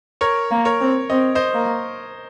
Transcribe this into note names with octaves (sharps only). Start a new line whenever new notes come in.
A#4 C#5
A#3
A#4 C#5
C4
C4 D#5
C5 D#5
A#3